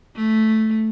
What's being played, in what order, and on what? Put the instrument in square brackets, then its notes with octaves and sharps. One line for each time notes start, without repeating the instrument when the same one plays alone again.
[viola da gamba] A3